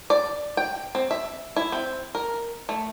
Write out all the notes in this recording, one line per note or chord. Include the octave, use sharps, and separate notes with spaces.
D5
G5
C4
E5
E4
C4
A#4
A3